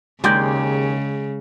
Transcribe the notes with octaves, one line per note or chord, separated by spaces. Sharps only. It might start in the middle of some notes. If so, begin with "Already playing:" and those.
D#2 C#3 G#3 G4 D5 G5